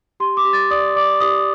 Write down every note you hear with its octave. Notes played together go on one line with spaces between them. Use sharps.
G4 C6
D6
G4
A6
D5 D#6
D5 D6
G4 D#6